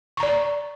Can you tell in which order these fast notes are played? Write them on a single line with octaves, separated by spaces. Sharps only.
C#6 A#5 D5